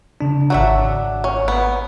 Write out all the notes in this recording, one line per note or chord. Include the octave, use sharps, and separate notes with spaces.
C#3 D4
G#1 F#3 D4 E5 F#5
C#4
B3